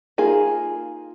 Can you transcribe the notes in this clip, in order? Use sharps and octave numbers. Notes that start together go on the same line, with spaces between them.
A#3 D#4 F4 G#4